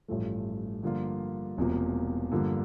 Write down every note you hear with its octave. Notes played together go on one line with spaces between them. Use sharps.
A1 G2 F3 A3
G2 D3 F3 A#3 F4
E1 E2 C3 F3 A#3
G2 D3 F3 A#3